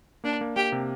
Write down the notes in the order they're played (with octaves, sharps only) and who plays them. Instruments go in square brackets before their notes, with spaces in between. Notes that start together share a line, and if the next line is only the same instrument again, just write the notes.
[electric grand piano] A#3 [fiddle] D4
[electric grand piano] A#3
[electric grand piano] A#3 [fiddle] G4
[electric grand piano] C3